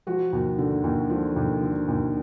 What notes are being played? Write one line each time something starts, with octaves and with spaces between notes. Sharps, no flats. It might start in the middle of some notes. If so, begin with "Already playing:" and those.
F3 F#4
D#2
D3
D#2
F3
D#2
D3
D#2